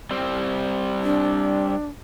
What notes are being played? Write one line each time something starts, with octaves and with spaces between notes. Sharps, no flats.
G3 C4
D4